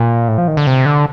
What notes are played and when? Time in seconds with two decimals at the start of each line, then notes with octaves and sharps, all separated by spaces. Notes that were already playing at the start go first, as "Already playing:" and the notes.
Already playing: A#2
0.28 A2
0.38 F3
0.48 D#3
0.57 D3
0.67 C3
0.86 D3